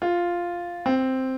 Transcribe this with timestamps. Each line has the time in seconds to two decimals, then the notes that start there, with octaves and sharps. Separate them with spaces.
0.02 F4
0.86 C4